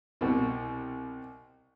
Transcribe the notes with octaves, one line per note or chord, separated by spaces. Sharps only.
C2 B2